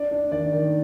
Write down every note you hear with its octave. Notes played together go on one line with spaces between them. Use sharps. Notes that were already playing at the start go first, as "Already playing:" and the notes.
Already playing: D4 D5
D4
D#3 D5
D#3